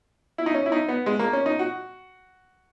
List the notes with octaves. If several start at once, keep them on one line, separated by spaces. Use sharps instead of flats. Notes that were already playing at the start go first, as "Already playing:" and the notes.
E4
D#4
C#4
E4
D#4
B3
G#3
A#3
C#4
D#4
F#4